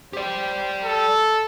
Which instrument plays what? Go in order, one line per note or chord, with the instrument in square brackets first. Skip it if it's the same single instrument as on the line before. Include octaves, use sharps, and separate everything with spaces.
[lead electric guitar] G4 D5 [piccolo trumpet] C5
[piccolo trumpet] A4